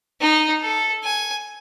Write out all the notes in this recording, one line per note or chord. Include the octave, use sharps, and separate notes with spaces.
D#4
A4
G#5